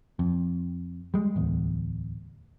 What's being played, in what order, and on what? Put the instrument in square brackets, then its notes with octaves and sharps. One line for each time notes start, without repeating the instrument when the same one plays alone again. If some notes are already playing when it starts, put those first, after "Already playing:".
[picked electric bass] F2
G3 G#3
D1 E2